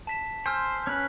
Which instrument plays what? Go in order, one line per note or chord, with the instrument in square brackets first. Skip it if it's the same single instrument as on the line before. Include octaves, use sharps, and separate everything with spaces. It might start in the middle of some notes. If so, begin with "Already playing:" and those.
[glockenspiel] A5 B6 E7
[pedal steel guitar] C5 [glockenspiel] G#5 E6 F6
[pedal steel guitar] C#4 B4